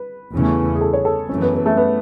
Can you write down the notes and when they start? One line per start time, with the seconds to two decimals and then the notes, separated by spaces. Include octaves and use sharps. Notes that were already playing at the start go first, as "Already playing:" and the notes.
Already playing: B4
0.33 E2 C#3 E3 A3 C#4
0.75 G#4
0.81 A4
0.93 C#5
1.05 A4
1.29 F#2 E3 A3 C#4
1.42 B3
1.54 B3
1.66 A3
1.77 B3